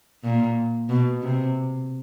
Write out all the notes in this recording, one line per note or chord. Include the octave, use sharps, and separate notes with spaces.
A#2
B2
C3